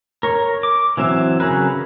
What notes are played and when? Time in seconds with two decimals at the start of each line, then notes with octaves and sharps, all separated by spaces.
0.23 A#4 C#5
0.63 D6
0.97 E3 F#3 C4 E5
1.40 C#3 F#3 G#4 A#4 B4